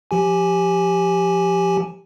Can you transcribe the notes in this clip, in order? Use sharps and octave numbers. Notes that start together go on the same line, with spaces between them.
F3 G4 G#5